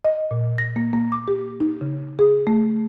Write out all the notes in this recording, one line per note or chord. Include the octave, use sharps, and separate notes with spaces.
D#5
A#2
A#6
A#3
A#3
D6
G4
D#4
C#3
G#4
A3